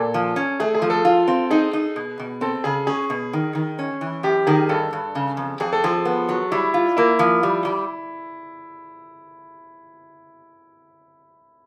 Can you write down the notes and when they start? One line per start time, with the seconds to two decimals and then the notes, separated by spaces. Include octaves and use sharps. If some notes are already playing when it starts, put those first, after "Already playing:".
Already playing: A#2 A4
0.14 F3
0.36 C#4
0.60 A3 G#4
0.74 G#4
0.82 F3
0.90 A4
1.05 F4
1.28 C4
1.51 D#4 G#4
1.73 D#4
1.96 B2
2.19 B2
2.41 C4 A4
2.64 C#3 G#4
2.87 C#4 G#4
3.10 B2
3.33 D#3
3.55 D#3
3.79 C#4
4.01 E3
4.23 F#2 G4
4.47 D#3 G#4
4.69 G2 A4
4.93 G2
5.15 C#3
5.37 F2
5.60 F2 G#4
5.73 A4
5.84 F3 G#4
6.05 B3
6.29 F#3
6.52 G3 E4
6.74 F4
6.97 A#3 E4
7.19 F3
7.43 G3
7.65 G3